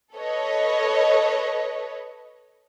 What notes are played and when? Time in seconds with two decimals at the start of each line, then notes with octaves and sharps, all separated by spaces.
0.14 A4 B4 C#5 D#5